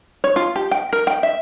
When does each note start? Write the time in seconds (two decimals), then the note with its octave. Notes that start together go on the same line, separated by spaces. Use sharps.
0.24 C#5
0.36 F4
0.56 G4
0.71 G5
0.93 A#4
1.07 G5
1.23 E5